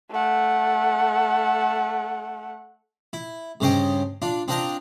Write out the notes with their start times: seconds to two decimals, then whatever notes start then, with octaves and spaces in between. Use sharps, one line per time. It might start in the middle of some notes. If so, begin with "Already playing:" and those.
0.11 A3 F#5
3.13 E4
3.60 G2 C#3 C#4 C5 D#5 G5
4.22 D4 F4
4.48 C4 D4 F4 D#5 G5 A#5